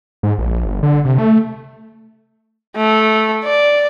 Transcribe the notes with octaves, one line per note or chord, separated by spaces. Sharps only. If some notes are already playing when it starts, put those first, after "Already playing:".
G#2
A#1
G1
D3
C3
A3
A3
D5